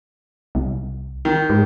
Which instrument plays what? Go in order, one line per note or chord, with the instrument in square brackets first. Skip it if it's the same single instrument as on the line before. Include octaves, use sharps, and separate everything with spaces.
[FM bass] C2
[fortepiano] D#3
[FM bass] G#2